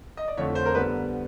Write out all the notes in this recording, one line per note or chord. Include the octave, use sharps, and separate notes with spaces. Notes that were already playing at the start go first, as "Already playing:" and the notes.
D#5
D5
F2 D3 F3 A3 C#5
C5
A#4
D3 G3 B3 B4